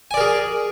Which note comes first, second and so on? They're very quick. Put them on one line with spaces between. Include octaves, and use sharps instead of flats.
G#5 D5 A#4 G#4